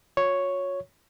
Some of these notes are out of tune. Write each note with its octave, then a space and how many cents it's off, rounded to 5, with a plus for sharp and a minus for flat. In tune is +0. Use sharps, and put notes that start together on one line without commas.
F#4 -45 C#5 +0